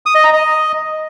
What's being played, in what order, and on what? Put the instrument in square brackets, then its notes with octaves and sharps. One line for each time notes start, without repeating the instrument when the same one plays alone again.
[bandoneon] D#6
D#5
A#5
D#5